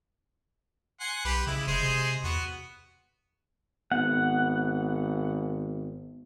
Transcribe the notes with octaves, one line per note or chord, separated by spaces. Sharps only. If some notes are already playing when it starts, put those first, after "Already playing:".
F#5 G#5 C6
B1 G4 B4
C#3 G#3 E4
F1 G#3 G#4 C5
C3
E2 B3 F#4
G#1 B3 F#5